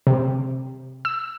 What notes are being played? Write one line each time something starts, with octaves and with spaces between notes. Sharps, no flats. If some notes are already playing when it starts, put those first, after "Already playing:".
C3
E6